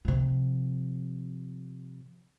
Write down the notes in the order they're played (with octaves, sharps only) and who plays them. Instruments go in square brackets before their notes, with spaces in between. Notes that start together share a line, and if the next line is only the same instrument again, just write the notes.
[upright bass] C3 F3